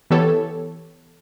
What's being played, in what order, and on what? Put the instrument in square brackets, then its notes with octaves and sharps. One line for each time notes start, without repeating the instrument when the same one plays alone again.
[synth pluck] E3 B3 G4 A4 C#5